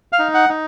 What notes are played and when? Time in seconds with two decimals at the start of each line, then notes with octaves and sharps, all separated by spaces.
0.13 F5
0.19 D#4
0.34 F#5
0.49 D#4